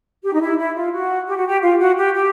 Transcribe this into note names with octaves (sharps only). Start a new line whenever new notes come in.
G4
D#4
E4
E4
F4
F#4
G4
F#4
G4
F4
F#4
G4
G4